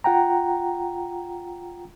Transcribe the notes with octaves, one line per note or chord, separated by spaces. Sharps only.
F4 F#5 G5 A#5